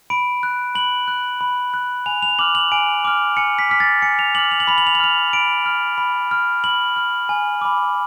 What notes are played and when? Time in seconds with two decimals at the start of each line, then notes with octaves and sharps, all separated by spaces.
0.10 B5 D7
0.43 F#6
0.75 B5 F#7
1.08 F#6
1.41 B5
1.74 F#6
2.06 G#5 F7
2.22 F7
2.39 D6 F6 F#7
2.55 F#7
2.72 G#5 D7
3.05 D6 F6
3.37 G#5 C#7
3.59 B6
3.69 D6 F6 B6
3.80 A6
4.02 G#5 C#7
4.19 F7
4.35 D6 F6 F#7
4.51 F7
4.60 F#7
4.67 B5 F7
4.78 F#7
4.87 F7
4.95 F#7
5.00 F6 F7
5.33 B5 D7
5.66 F6
5.98 B5
6.31 F6
6.64 B5 F#7
6.97 F6
7.29 G#5
7.61 B5 D6